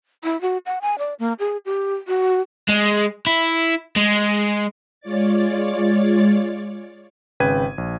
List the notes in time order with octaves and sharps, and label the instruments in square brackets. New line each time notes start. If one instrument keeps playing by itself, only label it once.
[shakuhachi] E4
F#4
F#5
G#5
D5
A#3
G#4
G4
F#4
[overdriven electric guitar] G#3
E4
G#3
[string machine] G#3 F4 C#5 D5 A6
[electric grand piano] G#1 C#3 B4 G5 G#6 D#7
A#1